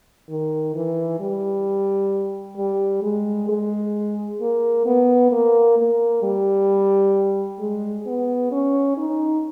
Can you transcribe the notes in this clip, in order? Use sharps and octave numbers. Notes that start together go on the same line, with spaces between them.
D#3
E3
G3
G3
G#3
G#3
A#3
B3
A#3
A#3
G3
G#3
B3
C#4
D#4